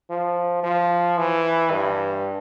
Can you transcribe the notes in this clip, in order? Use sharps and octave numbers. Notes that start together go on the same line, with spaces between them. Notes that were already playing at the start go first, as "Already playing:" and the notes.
F3
F3
E3
G2